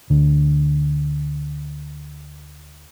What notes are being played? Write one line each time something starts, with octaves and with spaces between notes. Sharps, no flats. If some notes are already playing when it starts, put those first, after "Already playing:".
D2 D3